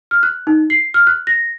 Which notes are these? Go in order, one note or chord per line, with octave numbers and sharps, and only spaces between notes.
F6
F#6
D#4
C7
F6
F#6
A#6